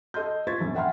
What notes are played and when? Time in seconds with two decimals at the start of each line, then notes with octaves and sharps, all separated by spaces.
0.14 A4 D#5 C6 G6
0.47 F4 C5 C#6 G#6 A6 B6
0.61 A#1 F#2
0.75 E5 F#5 G5 B5 C6 F6